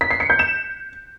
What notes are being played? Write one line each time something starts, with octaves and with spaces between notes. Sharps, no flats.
B6
C7
C#7
G6
E7